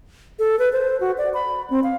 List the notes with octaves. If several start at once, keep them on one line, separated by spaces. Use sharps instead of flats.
A4
B4
C5
F#4
D5
B5
C4
F5